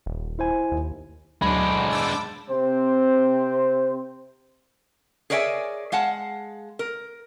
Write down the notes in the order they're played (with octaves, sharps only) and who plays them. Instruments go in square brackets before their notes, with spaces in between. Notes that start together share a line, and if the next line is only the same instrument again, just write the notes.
[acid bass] D#1
[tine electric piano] E4 C5 G#5
[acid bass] D#2
[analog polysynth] D2 F#3 [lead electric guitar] G#3 D4 [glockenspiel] B5
[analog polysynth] D6 E6 A6
[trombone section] C3 C4 C5
[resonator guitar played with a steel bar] G#4 A#4 C#5 D5 E5 G#5
G#3 F5 F#5 A5
A#4